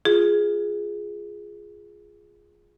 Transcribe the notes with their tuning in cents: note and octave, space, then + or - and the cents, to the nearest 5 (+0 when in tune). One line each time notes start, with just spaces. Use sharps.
F4 +0 G#4 +0